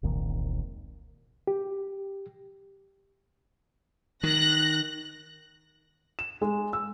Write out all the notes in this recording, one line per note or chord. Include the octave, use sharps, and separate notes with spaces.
E1 C2 A#2 D#3
G4
D#3 F#6 A#6
E7
G#3
E6